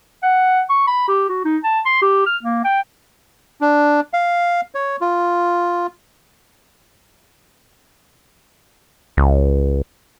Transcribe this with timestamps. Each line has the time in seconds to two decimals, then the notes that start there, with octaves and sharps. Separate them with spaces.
0.23 F#5
0.69 C#6
0.87 B5
1.08 G4
1.29 F#4
1.44 D#4
1.64 A5
1.85 C6
2.02 G4
2.26 F6
2.43 A#3
2.64 G5
3.61 D4
4.13 F5
4.75 C#5
5.01 F4
9.17 C#2